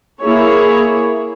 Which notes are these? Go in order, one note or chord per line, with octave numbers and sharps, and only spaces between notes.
A#3 E4 G#4 C#5